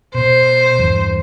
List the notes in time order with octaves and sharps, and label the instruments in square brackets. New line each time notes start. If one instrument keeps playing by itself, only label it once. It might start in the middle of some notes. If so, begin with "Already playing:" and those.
[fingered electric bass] B2 [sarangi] C5
[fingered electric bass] E2 G2